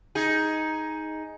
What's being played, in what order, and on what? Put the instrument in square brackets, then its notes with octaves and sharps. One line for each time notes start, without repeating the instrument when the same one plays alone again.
[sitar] D#4 G#4